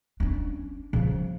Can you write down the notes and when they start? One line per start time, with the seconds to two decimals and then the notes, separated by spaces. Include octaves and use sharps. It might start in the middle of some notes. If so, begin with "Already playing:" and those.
0.20 C#4 D4
0.93 C#3 F3